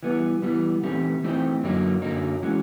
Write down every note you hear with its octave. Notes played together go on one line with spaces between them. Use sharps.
E3 G3 B3
E3 G3 B3
E3 A3 C4 D#4 G4
E3 A3 C4 D#4 G4
F#2 D3 F#3 A#3 D#4
F#2 D3 F#3 A#3 D#4
E3 G#3 C#4 F#4